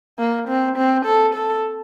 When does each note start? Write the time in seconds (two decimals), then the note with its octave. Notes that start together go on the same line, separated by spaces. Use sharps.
0.18 A#3
0.48 C4
0.77 C4
1.06 A4
1.34 A4